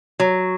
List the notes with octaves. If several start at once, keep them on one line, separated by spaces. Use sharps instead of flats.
F#3